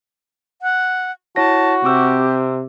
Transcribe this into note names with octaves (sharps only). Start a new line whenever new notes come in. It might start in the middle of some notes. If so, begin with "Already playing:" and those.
F#5
E4 F#4 C#5 A5 A#6
C3 C4 G4 D6 E6